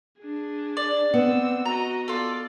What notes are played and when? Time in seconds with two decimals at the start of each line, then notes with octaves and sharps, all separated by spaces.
0.22 D4 G#4
0.77 D5
1.14 B3 C4 E6
1.66 F#4 D#5 A#5
2.08 F4 A4 D5